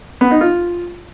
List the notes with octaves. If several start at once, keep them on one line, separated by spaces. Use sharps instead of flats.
B3
D#4
F4